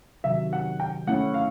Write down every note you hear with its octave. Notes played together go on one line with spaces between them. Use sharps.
C3 D#3 F#3 E5
F#5
G5
A3 C#4 E4 F#5
F5